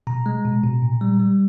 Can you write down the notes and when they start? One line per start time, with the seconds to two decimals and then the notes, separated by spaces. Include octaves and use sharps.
0.07 B2 A#5
0.26 G#3
0.45 B2
0.64 B2
0.82 A#2
1.01 G3
1.20 G3